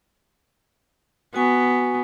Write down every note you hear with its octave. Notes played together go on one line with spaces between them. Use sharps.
B3 F#4 G#5 C#6